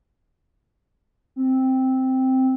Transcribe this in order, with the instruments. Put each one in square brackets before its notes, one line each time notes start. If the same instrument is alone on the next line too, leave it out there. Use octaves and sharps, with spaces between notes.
[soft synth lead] C4